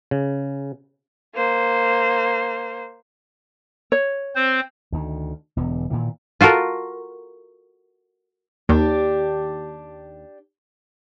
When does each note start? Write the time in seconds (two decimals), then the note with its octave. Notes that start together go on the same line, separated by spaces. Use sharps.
0.11 C#3
1.35 A#3 C5
3.92 C#5
4.35 C4 C5
4.92 D2 D#3
5.57 E1 E2 D3
5.90 A#2 D#3 E3
6.41 F4 F#4 A4 A#4
8.69 D#2 D4 G4